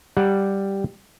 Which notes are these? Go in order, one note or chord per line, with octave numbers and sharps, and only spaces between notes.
G3 F#5